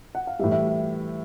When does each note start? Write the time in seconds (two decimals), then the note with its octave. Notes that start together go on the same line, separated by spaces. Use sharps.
0.15 F#5
0.27 F5
0.39 A2 E3 G3 E5
0.52 E5